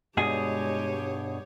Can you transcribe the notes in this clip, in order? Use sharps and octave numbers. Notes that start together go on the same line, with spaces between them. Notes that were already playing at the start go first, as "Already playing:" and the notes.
G2 B2 G#3 G4 G#4 C#5